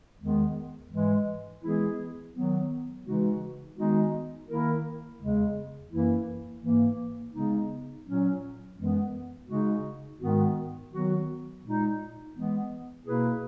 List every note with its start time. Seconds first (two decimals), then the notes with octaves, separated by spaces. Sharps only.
0.19 E2 D#3 G#3 B3
0.90 G#2 E3 G#3
1.61 E3 G#3 B3 E4 G#4
2.33 D#3 F#3 B3
3.04 C#3 E3 G#3 D#4 F#4
3.76 D#3 G#3 B3 D#4 F#4
4.47 D#3 A#3 E4 A#4
5.20 E2 C#3 G#3
5.90 F#2 E3 A#3 E4
6.62 G#2 E3 A#3
7.33 C#3 G#3 B3 D#4
8.05 A#2 F#3 C#4
8.77 F#2 E3 G#3 B3
9.48 C#3 G#3 D#4 F#4
10.19 G#2 D#3 G#3 B3 F#4
10.91 D#3 F#3 B3 F#4
11.63 A#2 G#3 D#4
12.34 E3 G#3 B3
13.05 B2 A#3 E4 G#4 B4